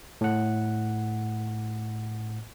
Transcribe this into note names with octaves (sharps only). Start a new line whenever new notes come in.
A2 F#5